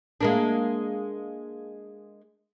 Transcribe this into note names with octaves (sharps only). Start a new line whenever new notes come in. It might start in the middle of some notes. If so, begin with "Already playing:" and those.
G#3 A#3 D4